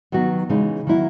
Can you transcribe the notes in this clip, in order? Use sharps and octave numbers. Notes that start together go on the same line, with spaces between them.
D#3 F#3 B3 F#4
C#3 E3 G#3 D#4
D#3 F#3 B3 E4